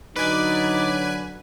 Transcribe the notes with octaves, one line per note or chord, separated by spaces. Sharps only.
D3 F#3 D#4 B4 D5 G#5